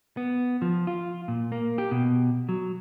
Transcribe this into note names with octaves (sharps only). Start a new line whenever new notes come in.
B3
F3
F4
A#2
A#3
G4
B2
F#3